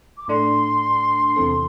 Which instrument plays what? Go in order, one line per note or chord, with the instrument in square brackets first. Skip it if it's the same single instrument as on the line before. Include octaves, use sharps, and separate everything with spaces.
[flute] D6
[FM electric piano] A2 A3 D4 [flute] C6
[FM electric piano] E2 C3 E3 C4 A4